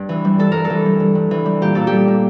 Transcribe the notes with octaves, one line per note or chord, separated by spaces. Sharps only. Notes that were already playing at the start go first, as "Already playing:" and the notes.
Already playing: G2
E3
G3
G2 A4
G2 A#4
A4
E3
G3
G2
G2
E3
G3
A#2 G4
A#2 A4
G3 G4
A#3